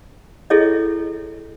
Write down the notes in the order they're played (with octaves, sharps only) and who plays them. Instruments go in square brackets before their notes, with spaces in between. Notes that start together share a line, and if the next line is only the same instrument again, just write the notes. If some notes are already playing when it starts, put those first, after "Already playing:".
[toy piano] E4 G#4 A4 C#5 D#5